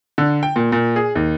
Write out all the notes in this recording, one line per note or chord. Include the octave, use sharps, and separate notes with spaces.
D3
G5
A#2
A#2
G#4
D#2